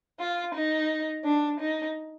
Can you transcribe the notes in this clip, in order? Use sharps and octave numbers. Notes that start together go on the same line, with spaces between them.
F4
D#4
D4
D#4